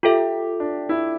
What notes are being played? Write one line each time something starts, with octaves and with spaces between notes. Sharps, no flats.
F4 G4 A4 E5
D4
E4